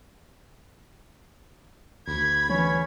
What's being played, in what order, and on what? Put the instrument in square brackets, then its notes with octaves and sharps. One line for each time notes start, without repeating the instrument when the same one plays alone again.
[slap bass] D2 [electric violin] B5 G#6
[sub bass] E3 [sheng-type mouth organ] C#4 C#5